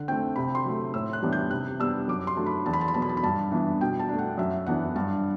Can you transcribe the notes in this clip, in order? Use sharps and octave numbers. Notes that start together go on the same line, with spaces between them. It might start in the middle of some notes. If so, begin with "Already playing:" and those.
Already playing: D3 F#5
A3 C4 G5
C3 B5
C6
F#3 A3
A2 E6
F#6
E3 G3 B3 D4
G6
C3 F#6
G3 B3 D4 E6
F#2 D6
C6
F#3 A3 D4
B5
E2 A5
B5
A5
B5
B2 F#3 B3 A5
B5
A5
B5
G2 A5
E3 B3 D4
B2 G5
A5
A3 D4
F#5
F#2 E5
E3 B3 D4 F#5
G2 A5